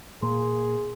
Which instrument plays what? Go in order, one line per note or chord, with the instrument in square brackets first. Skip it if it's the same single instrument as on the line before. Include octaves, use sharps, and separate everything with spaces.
[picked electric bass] A#2 A#3 [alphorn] G#4 [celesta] C6